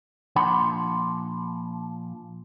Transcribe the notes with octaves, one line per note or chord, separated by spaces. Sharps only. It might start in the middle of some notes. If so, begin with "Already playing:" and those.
A#2 F3 D4 F#5 B5 C6